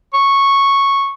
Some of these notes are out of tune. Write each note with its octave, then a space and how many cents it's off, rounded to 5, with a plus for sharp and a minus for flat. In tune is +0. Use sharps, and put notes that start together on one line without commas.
C#6 -5